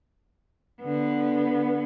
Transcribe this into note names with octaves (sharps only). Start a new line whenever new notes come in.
D3 B3